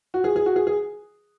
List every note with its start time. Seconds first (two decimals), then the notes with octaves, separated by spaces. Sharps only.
0.14 F#4
0.24 G#4
0.36 G#4
0.46 F#4
0.56 G#4
0.67 G#4